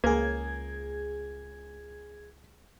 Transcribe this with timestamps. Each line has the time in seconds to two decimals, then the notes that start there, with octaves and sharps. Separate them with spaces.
0.04 C#2 A#3 G#4 G#6